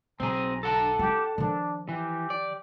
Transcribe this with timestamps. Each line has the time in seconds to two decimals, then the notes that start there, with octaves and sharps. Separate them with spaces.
0.20 B1 C4 G#4 A#5
0.63 A4 F#5 A5
0.99 E4 F4 G4
1.38 D#3 F3 D4
1.89 E3 G4
2.30 D5